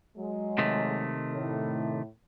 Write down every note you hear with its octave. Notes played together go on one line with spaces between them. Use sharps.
F#3 G#3
C3 D#3 A3
A2